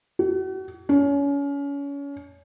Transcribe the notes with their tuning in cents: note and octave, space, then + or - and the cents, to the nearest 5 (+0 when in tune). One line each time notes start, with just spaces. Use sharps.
F#4 +40
C#4 +30